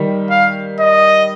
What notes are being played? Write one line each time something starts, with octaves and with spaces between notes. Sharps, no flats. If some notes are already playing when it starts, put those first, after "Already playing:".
Already playing: D#3 G3
F5
D#5